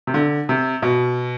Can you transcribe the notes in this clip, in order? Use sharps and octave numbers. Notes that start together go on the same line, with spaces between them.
C3
D3
C3
B2